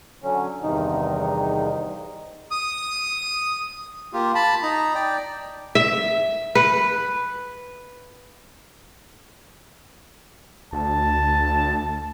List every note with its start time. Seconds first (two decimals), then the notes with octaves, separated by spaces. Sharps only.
0.23 D3 F#3 C#4
0.63 E2 G2 C3 D#3 D#4
2.51 D#6
4.13 A#3 F4 G4
4.35 A5 B5
4.63 D#4 A#5
4.95 D5 G5
5.75 E5
6.55 B4
10.73 D2 A5